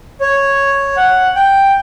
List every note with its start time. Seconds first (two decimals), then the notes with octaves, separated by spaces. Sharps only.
0.21 C#5
0.96 F#5
1.36 G5